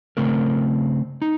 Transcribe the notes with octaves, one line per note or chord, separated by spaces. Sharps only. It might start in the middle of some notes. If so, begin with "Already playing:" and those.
C#3 A3 C4 A#4
D#4